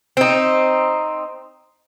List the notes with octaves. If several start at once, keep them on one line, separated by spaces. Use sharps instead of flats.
C4 D#4